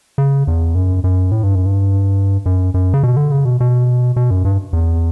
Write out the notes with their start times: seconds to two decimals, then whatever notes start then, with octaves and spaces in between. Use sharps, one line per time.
0.18 C#3
0.47 E2
0.75 F#2
1.04 F#2
1.32 A2
1.43 G2
1.55 F#2
1.66 G2
2.46 F#2
2.74 F#2
2.94 C#3
3.03 B2
3.17 D3
3.32 C#3
3.45 B2
3.60 B2
4.16 B2
4.30 F#2
4.45 G2
4.73 E2